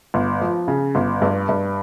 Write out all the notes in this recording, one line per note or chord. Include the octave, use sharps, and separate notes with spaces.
G1
F3
C#3
G1
G2
G2